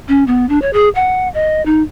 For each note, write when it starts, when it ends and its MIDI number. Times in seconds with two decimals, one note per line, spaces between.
0.08 0.24 61
0.27 0.48 59
0.49 0.61 62
0.62 0.71 73
0.73 0.89 68
0.95 1.28 78
1.34 1.64 75
1.66 1.82 63